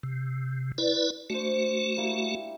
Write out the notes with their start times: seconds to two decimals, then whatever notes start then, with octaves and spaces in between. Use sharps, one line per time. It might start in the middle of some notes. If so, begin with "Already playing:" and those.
0.03 C3
0.78 E4 B4 D5
1.30 A3 D4 F#4 C5
1.97 G3 A#3 E4